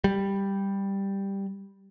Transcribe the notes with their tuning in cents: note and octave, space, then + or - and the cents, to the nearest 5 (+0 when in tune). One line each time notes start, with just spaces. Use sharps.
G3 +5